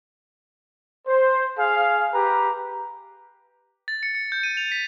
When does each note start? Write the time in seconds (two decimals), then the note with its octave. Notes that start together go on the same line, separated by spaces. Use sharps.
1.07 C5
1.58 G#4 F5
2.13 G4 B4 A#5
3.88 A6
4.03 C#7
4.15 C#7
4.32 G6
4.43 D#7
4.57 F7
4.72 B6